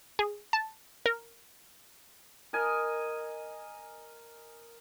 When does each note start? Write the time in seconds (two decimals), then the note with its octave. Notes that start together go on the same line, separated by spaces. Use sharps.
0.19 G#4
0.53 A5
1.06 A#4
2.53 A#4 D#5 G#5